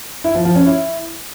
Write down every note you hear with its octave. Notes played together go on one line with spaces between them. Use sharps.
E4
F3
F3
C#4
E4